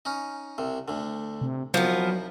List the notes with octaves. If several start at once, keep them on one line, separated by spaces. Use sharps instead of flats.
C#4 D#4
C2 C3
D2 D3
C3
C2 F3 F#3 B3 D#4 D#6